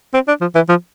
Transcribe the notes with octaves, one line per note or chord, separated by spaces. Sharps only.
C4
D4
F3
E3
F3